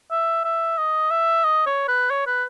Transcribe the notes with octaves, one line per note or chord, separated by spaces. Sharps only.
E5
E5
D#5
E5
D#5
C#5
B4
C#5
B4